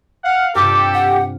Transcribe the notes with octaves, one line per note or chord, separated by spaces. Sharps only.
F5 F#5
G2 C3 F4 G4 A4 D6
F#5